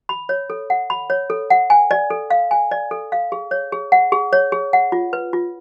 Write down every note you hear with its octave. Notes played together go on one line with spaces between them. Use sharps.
B5
C#5
A4
F#5
B5
C#5
A4
F#5
G#5
D5
A4
F5
G#5
D5
A4
F5
G#4
C#5
G#4
F#5
G#4
C#5
G#4
F#5
F4
B4
F4